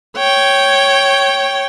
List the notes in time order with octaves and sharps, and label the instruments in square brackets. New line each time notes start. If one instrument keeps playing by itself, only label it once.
[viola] C#5 G5